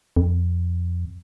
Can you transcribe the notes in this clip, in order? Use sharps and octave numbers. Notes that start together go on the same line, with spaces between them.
F2